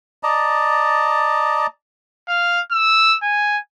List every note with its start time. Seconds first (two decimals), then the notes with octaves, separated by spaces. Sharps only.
0.23 D5 D#5 A5 A#5
2.28 F5
2.71 E6
3.22 G#5